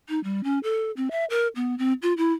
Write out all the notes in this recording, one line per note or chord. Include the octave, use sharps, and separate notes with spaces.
D#4
G3
C#4
A4
C4
E5
A#4
B3
C4
F4
E4